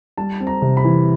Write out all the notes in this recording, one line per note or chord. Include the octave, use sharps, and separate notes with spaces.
G3 A5
C4
A#5
C3
B5
E3